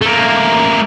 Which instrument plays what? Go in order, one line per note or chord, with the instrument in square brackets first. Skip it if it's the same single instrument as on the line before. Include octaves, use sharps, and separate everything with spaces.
[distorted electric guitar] A3 A#3